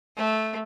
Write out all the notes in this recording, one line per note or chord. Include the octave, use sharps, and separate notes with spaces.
A3